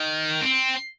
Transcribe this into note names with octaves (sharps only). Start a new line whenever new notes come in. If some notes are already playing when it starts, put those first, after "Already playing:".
Already playing: D#3
C4